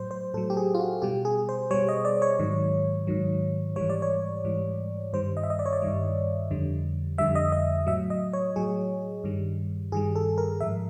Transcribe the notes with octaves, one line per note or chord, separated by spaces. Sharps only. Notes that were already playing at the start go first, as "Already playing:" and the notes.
Already playing: A2 F#3 C5
C5
A2 F#3 A4
G4
G#4
F4
F#4
B2 G3 G4
G#4
C5
B2 G3 C#5
D#5
D5
C#5
G#2 D#3 F#3
G#2 D#3 F#3
G#2 E3 G3 C#5
D5
C#5
G#2 E3 G3
G2 D#3 G3 C5
D#5
E5
D#5
D5
C#5
D5
G2 D#3 G3
F2 D3 G3
F2 D3 G3 E5
D#5
D#5
A2 F#3 E5
D#5
C#5
A2 F#3 G#4
G2 D#3 G3
G2 D#3 G3 G#4
A4
A#4
G#2 F3 E5